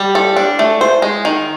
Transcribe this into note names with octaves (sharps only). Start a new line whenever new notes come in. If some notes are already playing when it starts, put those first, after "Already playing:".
Already playing: G3
A4
D4
A3
C5
G#3
D#3